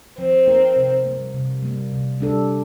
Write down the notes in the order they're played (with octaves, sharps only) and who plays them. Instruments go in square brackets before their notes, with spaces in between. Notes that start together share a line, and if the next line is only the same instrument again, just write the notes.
[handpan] F3 [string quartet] C4
[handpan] A#3 D#4 A#4
C3
G3 A#3
C3
G3 A#3
C3
G3 D4 A4